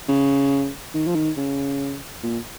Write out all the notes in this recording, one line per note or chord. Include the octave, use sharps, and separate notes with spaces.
C#3
D#3
F3
D#3
C#3
A#2